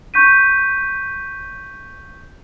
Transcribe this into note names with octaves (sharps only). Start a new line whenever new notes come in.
C#6 G6 B6 D#7